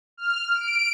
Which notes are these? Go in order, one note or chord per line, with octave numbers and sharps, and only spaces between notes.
F6
D7